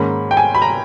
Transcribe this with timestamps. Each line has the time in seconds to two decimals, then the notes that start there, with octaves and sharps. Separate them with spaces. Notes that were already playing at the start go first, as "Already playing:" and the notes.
Already playing: G#2 D#3 A#3 C#4 B5
0.31 G5
0.37 G#5
0.55 B5
0.62 A#5